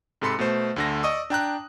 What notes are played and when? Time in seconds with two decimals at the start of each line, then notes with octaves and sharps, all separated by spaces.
0.21 G#2 C3 A4 B5 C6 C#7
0.39 B2 A3 C5
0.76 D2 D3 A#6
1.03 D5 D#5 C#6 D#6 E6
1.30 D4 G5 A#5 F#6